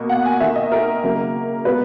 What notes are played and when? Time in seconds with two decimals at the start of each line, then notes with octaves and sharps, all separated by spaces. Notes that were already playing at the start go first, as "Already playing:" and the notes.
Already playing: B2 A#3
0.10 F#5
0.26 G#5
0.40 D#3 A#3 E5
0.56 D#5
0.72 A#4
1.03 C#3 F#3 A#3
1.65 B2 G#3 B3 B4